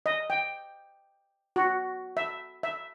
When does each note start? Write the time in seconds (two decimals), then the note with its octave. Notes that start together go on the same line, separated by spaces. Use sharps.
0.06 D#5
0.30 G5
1.56 F#4
2.17 E5
2.63 E5